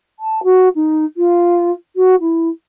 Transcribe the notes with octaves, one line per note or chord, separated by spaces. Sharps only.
A5
F#4
D#4
F4
F#4
E4